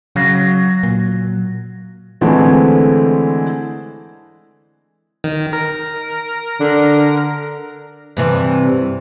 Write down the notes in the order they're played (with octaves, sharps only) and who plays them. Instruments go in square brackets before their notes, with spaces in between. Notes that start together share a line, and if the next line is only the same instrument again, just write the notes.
[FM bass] C#3 [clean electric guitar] F#3 F#4 F5
[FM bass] A#2
[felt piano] D3 E3 G#3 A3 C4
[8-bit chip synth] D#3
A#4
[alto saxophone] D3
[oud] G2 C3 E3